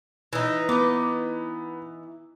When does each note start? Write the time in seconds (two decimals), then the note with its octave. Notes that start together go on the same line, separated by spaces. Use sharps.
0.33 E3 D#4
0.69 B3 D#5 D6